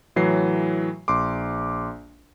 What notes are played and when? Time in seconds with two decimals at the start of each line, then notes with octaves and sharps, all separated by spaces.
0.16 A2 E3 F#3 C7
1.08 A#1 C6 D6